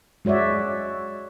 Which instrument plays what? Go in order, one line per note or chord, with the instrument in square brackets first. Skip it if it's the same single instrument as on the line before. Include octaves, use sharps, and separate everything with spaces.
[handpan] G#3 F#4 C#5 D5 E5